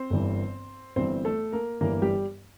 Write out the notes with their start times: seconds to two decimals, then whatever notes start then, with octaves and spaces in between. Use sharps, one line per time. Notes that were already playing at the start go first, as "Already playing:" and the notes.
Already playing: C4 C5
0.10 G1 G2 E3
0.96 G1 G2 E3 C4 C5
1.25 A3 A4
1.52 A#3 A#4
1.81 G1 G2 E3 A#3 A#4
2.02 G3 G4